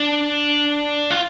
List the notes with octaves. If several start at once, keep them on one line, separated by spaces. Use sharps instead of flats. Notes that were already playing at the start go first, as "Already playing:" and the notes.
Already playing: D4
F4